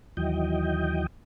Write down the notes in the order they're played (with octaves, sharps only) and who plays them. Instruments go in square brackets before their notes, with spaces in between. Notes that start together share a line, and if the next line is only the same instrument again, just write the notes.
[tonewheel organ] D#2 E3 F#3 D#5 G5